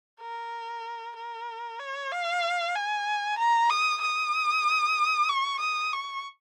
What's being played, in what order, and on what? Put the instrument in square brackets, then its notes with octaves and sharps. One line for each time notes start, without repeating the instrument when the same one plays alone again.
[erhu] A#4
A#4
C#5
F5
G#5
A#5
D#6
D#6
C#6
D#6
C#6